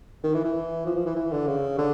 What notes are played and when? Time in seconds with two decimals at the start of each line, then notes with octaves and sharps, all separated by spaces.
0.24 D#3
0.34 E3
0.44 E3
0.86 F3
0.96 F3
1.06 E3
1.16 E3
1.32 D3
1.48 C#3
1.78 D3